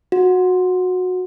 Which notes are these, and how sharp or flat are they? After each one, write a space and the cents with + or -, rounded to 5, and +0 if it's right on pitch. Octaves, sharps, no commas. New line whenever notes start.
F#4 -20